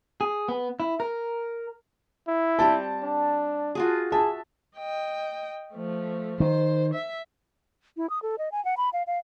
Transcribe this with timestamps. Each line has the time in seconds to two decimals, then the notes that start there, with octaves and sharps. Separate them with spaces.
0.21 G#4
0.48 B3
0.80 E4
1.00 A#4
2.28 E4
2.59 G3 C4 G5 A5
3.03 D4
3.75 F4 F#4 G#4
4.12 G#4 E5 A5
4.77 D#5 G5
5.74 F3 A3
6.40 D#3 C5
6.94 E5
7.97 E4
8.10 D#6
8.22 A4
8.38 D#5
8.52 G#5
8.65 F#5
8.77 B5
8.93 F5
9.07 F5